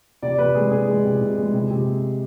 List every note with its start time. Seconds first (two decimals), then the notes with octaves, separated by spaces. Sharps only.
0.22 C3 D5
0.38 C3 B4
0.55 G#3 G#4
0.71 C3 G#4
0.88 G#3
1.05 C3
1.21 C3
1.37 G#3
1.54 C3
1.70 C3